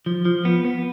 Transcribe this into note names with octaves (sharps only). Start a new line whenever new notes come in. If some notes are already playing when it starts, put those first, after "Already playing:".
F3
F3
B3
B3